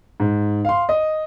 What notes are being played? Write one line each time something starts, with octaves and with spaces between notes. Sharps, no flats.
G#2
F5 C6
D#5